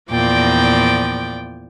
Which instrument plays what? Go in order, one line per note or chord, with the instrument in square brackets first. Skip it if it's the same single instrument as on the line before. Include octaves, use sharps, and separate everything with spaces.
[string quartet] E2 A#2 F3 D5 G5